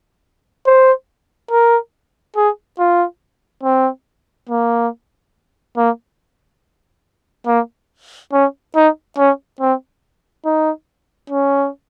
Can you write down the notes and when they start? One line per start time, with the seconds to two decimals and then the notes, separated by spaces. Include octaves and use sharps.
0.66 C5
1.51 A#4
2.36 G#4
2.79 F4
3.63 C4
4.49 A#3
5.77 A#3
7.47 A#3
8.32 C#4
8.75 D#4
9.17 C#4
9.60 C4
10.45 D#4
11.30 C#4